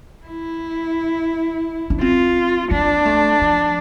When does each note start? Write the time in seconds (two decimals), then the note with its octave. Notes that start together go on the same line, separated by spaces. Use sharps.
0.26 E4
1.90 D4
2.01 C4 F4
2.71 A#3 D4
3.05 A3
3.41 F3